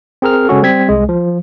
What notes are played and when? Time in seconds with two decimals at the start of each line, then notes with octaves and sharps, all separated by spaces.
0.22 C4 G#4 A#4 F6
0.48 C#3 G#3 C#4 F#4 A4
0.63 G3 C4 G#6 B6
0.89 C2 G#3
1.09 F3